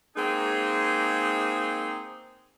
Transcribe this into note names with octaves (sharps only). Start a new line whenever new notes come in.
G#3 A#3 C4 D#4 G#4